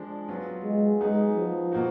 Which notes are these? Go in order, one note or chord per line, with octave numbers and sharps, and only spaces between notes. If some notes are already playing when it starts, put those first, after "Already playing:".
Already playing: F3 G#3 D4
F#3 B3 F4
G#3
F#3 G#3 B3 D#4 G#4
F3
B2 A#3 D#4 F#4